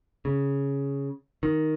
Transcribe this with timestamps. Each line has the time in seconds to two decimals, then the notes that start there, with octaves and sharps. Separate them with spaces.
0.25 C#3
1.43 D#3